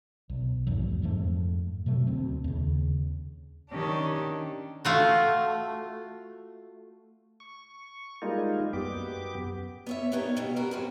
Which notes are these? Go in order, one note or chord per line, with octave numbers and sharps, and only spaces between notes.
B1
G#1 E2 G#2 F#3
F2 G#2 F3 A3
B2 F#3 A3
D2 C4
D#2 C#3
D#3 C#4 D4 G4
A3 F4 F#4
C#6
G3 G#3 A#3 D#4 F4
F#2 B3 G4 D6
B3 C#5 E5
G3 B3 D4 D#4 A#4 C#5
G2 B2
F#4 G4 A#4 B4
F#2 C4 C#4